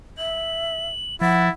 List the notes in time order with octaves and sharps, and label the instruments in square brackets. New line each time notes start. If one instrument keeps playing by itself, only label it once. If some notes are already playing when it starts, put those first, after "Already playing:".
[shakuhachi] E5 [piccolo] F#7
[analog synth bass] F3 [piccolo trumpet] E4 [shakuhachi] F#5 [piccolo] A6